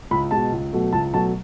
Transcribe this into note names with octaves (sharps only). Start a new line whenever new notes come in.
C#2 B5
B2 G#3 A5
C#2
B2 F#3 A3
C#2 A5
B2 F#3 A3 A5